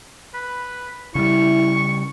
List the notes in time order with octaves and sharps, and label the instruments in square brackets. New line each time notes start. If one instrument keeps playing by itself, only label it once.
[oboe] B4
[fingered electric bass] C#3 G3 [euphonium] E4 [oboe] C#6